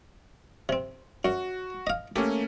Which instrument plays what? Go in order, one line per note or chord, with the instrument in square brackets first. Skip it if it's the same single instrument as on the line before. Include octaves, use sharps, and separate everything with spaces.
[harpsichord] C3 C4
[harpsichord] F#2 [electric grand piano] F#4
[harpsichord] D#5 F5
[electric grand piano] A3 A#3 C#4 [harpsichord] G4